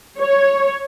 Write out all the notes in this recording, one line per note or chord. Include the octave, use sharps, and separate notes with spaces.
C#5